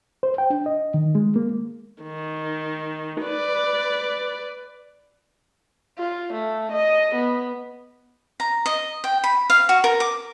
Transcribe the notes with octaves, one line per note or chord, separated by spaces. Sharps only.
C5
G5
D4
D#5
D#3
G#3
A#3
D#3
B4 D5
F4
A3
D#5
B3
A#5
D#5
G5
B5
F5
F#4
A#4
D6